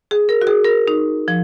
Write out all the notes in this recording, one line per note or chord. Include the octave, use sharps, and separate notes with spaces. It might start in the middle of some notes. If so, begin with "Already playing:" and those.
G#4
A#4
F#4
G#4
A#4
D#4
F3